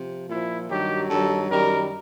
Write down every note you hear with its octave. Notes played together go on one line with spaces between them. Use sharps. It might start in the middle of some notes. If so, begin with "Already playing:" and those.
Already playing: C3 F3
A#2 F3 E4
G2 D#3 F#3 G4
G2 D#3 F#3 A4
F#2 D#3 G3 A#4